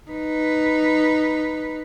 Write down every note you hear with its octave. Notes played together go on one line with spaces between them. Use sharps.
D#4 B4